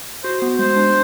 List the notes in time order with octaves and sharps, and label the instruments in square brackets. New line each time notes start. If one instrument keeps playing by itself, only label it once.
[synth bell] F#4 [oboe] C5
[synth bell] B3
[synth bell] G#3 [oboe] C5
[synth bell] D4